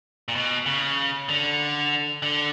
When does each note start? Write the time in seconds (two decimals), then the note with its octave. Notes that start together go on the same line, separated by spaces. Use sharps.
0.28 A#2
0.35 B2
0.66 C#3
1.29 D3
2.23 D3